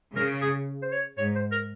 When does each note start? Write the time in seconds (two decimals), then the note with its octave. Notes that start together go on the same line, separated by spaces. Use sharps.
0.16 C#3 A#4
0.41 G#4
0.82 C5
0.92 C#5
1.17 G#2 C#5
1.35 C5
1.52 A#4